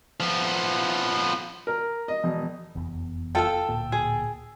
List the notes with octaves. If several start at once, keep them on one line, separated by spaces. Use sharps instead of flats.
F3 B3
A#4
D#5
E1
F1 E2
F4 A4 G5 A5 E6
D1 A#2
G#4